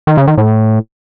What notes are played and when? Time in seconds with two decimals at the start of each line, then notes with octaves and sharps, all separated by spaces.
0.07 D#3
0.17 C#3
0.27 D#3
0.38 A2